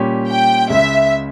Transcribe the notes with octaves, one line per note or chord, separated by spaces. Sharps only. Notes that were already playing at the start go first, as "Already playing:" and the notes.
Already playing: A#2 G3 C#4 G4
G5
C#2 C#3 G#3 E5